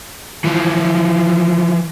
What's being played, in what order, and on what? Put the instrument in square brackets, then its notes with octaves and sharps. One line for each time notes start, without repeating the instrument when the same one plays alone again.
[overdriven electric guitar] E3 F3